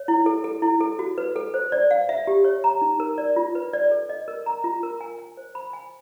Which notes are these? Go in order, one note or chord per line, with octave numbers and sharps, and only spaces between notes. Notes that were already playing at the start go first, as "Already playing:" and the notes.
Already playing: C#5
E4
A4
A4
E4
A4
F#4
B4
A4
C5
D5
F5
E5
G4
C#5
A#5
D#4
A#4
D5
F4
B4
D5
A4
D#5
A#4
A#5
F4
A#4
G#5
G#5
C5
B5
G#5